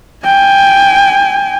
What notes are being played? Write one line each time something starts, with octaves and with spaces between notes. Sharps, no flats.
G5 G#5